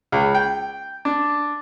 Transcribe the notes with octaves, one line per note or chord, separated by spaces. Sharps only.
C#2
G5
D4